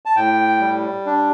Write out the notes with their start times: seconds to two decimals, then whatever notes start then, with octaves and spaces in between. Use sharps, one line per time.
0.06 A5
0.16 A2 G5
0.60 G3
1.06 D4